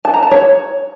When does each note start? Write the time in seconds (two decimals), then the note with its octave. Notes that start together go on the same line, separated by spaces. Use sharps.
0.05 A5
0.14 A#5
0.23 A5
0.31 C#5